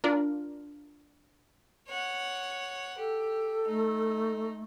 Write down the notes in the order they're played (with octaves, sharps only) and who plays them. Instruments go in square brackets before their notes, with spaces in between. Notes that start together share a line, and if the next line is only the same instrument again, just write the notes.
[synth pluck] D4 F4 A#4
[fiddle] C#5 F#5
[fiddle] G4 [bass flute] A4
[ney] A3 [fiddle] D#4